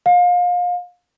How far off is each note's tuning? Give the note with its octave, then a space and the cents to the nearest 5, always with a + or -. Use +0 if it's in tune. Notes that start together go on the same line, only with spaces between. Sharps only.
F5 +30